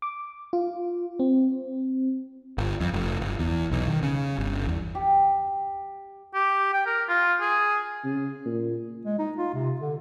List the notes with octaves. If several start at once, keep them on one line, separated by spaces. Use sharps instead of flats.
D6
F4
C4
G1
F2
F1
G1
E2
B1
D#3
C#3
G1
E2
G4
G4
G5
A#4
F4
G#4
C#3
A#2
G#3
D#4
F4
C3
D3